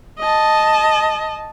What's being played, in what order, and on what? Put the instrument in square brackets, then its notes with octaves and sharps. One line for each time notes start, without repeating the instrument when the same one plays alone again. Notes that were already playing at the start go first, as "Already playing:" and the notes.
[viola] D#5 A5